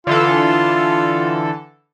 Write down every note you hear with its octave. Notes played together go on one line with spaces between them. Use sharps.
D3 E3 F4 A4